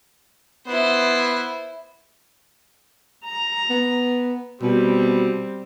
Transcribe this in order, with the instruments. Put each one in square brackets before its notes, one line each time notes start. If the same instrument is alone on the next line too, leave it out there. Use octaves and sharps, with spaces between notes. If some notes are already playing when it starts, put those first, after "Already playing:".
[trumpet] B3 [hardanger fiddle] E4 C5
[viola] A#5
[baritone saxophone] B3
[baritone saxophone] B2 [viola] G3 C4